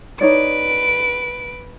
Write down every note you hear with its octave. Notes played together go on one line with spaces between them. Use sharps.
D#4 B4 C#5 D5 D7